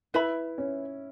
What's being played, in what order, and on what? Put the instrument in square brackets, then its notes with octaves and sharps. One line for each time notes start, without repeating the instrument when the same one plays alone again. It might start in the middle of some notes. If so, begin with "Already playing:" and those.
[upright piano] E4 [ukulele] B4 E5 B5
[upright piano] C#4